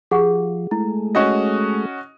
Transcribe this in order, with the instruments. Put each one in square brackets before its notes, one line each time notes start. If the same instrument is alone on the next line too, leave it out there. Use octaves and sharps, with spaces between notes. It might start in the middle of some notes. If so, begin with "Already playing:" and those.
[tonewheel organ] F3 [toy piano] G4 G#4 F#5
[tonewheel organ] G#3 A3 [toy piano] E4
[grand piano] C#4 F#4 D#5